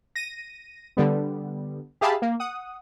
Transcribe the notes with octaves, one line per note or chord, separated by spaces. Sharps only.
A#6 D#7
D3 G3 B3
G4 G#4 E5 F5 A5 B5
A#3
F#5 D#6